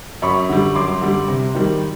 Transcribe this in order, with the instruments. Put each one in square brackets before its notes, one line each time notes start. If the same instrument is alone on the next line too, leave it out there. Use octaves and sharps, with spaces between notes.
[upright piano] F#2 B5 C#6
D3 G3
F#2 C6 D6
D3 G3
C3
D#3 G3